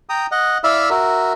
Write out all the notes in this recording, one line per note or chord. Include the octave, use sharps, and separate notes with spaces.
G5 A#5 D#6
D#5 F#5
E4 D5 E5 F5 B5 E6
F#4 A#4 E5